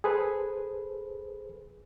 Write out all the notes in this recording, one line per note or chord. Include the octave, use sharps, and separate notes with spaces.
G#4 A4 B4 C5